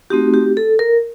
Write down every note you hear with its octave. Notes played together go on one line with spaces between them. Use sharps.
A3 C4 D#4 F#4 G4
G4
A4
A#4